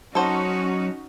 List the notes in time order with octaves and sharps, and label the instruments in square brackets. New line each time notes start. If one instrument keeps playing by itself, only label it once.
[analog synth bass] F#3 [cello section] C#4 D#4 F#4 [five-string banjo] A4 C5 F#5